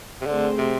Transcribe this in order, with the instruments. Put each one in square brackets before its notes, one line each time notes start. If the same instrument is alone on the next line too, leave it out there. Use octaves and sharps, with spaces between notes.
[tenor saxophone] C3
[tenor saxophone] D3 [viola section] A3 C4 G#4 C5
[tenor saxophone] C3